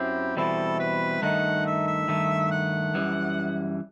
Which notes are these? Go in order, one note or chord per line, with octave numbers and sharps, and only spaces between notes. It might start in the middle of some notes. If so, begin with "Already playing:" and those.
Already playing: F#2 F#3 C4 E4 G4
E2 B2 G3 C4 E4 A4
B4
G2 D#3 A3 D#4 F#5
E5
E5
G2 D#3 A3
F#5
F#2 E3 G3